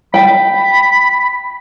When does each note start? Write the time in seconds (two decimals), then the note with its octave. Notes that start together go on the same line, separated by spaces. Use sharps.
0.14 G5 B5